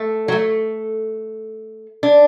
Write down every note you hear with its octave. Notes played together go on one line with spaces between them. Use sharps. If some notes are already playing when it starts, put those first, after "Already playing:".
Already playing: A3
F#3
A3
D4